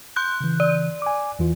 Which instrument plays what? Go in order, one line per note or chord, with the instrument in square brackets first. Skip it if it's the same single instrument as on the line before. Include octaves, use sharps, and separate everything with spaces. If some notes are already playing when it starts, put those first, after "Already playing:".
[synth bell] C6 F#6 G6
[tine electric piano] C#3 E3
[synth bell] D5
[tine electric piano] G#5 D6
E2 E3 F4